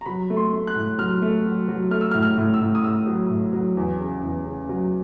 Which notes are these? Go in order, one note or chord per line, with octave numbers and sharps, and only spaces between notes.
A#5
F#3 B5
A3
C6
A3
F#6
A2
F#3 F6
A3
F#3
F#3
A3 F6
E6
F6
A2
F6
A2
E6
A2
D#6
A2 E6
F#3
A2
F#3
E2
C#3
E2
C#3
F#3